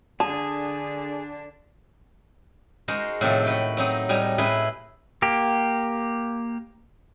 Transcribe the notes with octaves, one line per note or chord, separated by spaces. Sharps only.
D3 D4 G#4 A5
G#3 D#4 F#4 A#4 C5
A2 C3 D#3 F3 F#3 A4
F#4 B4 G5
F#3 C4 D#4 D#5
A2 G3 D#4 G#5 A#5
A2 E4 G#4 B4 D#5
A#3 G4